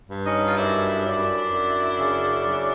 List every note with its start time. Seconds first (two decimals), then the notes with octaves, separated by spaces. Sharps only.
0.10 G2
0.25 C#4 D#4
0.48 F4
0.56 F#2 D4 E4
1.04 F#2 D4 E4
1.52 F#2
1.99 C#3
2.47 F#3